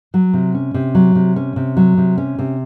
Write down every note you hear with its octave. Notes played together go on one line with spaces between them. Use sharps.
F#3
C3
C#4
C3
F#3
C3
C#4
C3
F#3
C3
C#4
C3